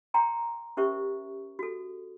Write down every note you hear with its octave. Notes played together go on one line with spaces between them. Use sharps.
C#5 G5 A#5 C6
C#4 G4 A#4 C5 E5 C#6
F#4 A4